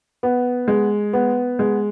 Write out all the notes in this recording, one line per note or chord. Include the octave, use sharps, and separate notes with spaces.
B3
G#3
B3
G#3